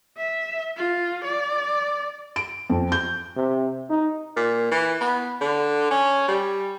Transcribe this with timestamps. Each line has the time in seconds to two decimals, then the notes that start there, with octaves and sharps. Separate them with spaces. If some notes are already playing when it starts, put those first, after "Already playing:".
0.18 E5
0.77 F4
1.24 D5
2.36 D7
2.70 F2
2.92 G6
3.36 C3
3.90 D#4
4.36 A#2
4.71 E3
5.01 B3
5.41 D3
5.90 C#4
6.28 G3